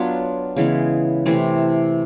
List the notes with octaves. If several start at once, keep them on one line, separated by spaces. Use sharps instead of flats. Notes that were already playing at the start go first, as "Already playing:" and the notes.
Already playing: F#3 B3 D4 F4
C#3 E3 G#3 B3
C3 E3 A3 C4